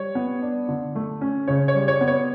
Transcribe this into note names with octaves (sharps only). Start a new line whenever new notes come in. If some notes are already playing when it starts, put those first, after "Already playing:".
Already playing: G3 C#5
B3
D4
D3
A3
C#4
C#3 C#5
C#5
G3
C#5
B3
C#5